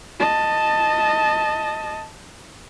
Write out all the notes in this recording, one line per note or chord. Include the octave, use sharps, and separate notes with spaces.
D#5 A5